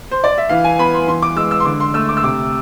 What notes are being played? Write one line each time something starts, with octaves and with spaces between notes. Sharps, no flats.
C5
D5
E5
E3 F5
G#5
B3 B5
C6
E3 C6
D6
G#3 E6
E6
C6
D3 D6
C6
A3 E6
D6
E6
C3 D6